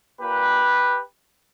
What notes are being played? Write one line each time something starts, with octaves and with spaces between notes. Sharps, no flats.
A#2 A#3 G4 B4